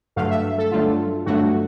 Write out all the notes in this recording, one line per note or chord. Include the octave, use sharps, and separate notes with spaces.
G2 D3 F#3 A3 F5
E5
A4
G2 D3 F#3 A3 F4
G2 D3 F#3 A3 F#4